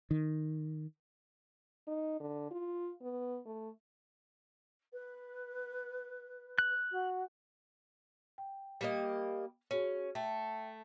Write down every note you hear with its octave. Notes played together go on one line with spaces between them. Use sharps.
D#3
D#4
D3
F4
B3
A3
B4
F#6
F#4
G5
G3 A#3 D#5
C#4 F#4 G#4 C#5
A3 E5 G5